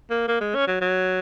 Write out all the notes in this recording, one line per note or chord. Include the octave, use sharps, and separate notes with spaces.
A#3
A#3
G#3
C#4
F#3
F#3